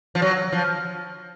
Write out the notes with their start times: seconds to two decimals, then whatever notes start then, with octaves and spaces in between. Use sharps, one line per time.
0.15 F3
0.22 F#3
0.52 F3